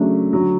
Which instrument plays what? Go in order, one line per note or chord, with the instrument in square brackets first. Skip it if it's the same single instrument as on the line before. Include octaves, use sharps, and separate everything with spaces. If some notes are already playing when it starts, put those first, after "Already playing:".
Already playing: [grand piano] C#3 F#3 A3 D4
D3 F#3